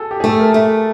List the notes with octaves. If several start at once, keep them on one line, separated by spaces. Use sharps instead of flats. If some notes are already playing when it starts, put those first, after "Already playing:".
Already playing: F#4 G#4 A4
G4
A3 G#4
A4
A#4
A3